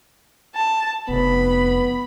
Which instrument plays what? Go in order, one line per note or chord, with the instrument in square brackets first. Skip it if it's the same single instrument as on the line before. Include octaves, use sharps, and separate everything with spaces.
[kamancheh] A5
[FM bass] F1 [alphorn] B3 [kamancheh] B5